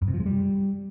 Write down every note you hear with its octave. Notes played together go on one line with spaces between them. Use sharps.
F#2
C3
F3
G#3
G3